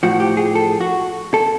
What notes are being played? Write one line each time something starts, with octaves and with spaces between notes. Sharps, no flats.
A2 F3 F#4
G4
G#4
A4
F#4
A4